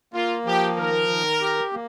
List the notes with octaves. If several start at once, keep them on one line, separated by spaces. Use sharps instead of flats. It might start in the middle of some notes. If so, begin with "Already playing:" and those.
A#3 F4
F3 G4
D#3 A#4
D#3
G4
A#3